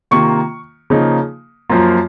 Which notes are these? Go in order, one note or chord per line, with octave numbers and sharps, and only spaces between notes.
C3 D#3 A#3 F4 C#6
C#3 F3 A#3 D#4
F#2 F3 A#3 F4